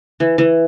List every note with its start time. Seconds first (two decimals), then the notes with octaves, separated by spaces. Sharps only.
0.20 E3
0.38 E3